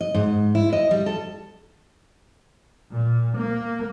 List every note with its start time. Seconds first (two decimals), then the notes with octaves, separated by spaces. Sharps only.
0.01 D#5
0.14 G#2
0.55 E4
0.73 D#5
0.91 G3
1.06 A4
2.92 A#2
3.38 A#3